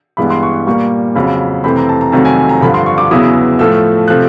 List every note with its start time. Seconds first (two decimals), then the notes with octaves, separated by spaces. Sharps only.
0.17 G2 E3 G#3 B3 B5
0.30 C6
0.43 C#6
0.67 A#2 G3 A#3 C#6
1.15 F2 C#3 F#3 B5
1.64 F2 C3 E3 A3 C4 B5
1.76 A#5
1.89 A5
2.01 A#5
2.12 F2 C3 D#3 F#3 A3 A5
2.25 G#5
2.38 G#5
2.49 A#5
2.61 G2 D3 F3 B5
2.74 C6
2.86 C#6
2.98 D6
3.11 E2 C#3 F#3 B3 E4 D#6
3.59 A2 F3 A3 E6
4.08 C3 F3 A3 F#6